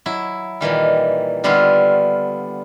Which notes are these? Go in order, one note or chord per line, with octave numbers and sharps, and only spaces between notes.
F#3 E4
A#2 D#3 E3 G3
D3 G3 B3 E4 F4